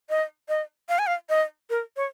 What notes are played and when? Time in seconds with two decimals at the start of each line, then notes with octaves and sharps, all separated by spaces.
0.10 D#5
0.49 D#5
0.89 F5
0.99 G#5
1.07 F5
1.29 D#5
1.70 A#4
1.96 C#5